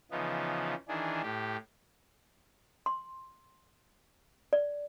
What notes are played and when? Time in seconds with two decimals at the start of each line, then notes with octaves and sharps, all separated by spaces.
0.11 C#3 E3 F3 B3 D#4
0.88 D#3 E3 D4 G#4
1.22 A2 G4
2.86 C6
4.53 D5